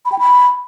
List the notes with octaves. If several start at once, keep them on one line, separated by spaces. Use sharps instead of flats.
B5
G5
B5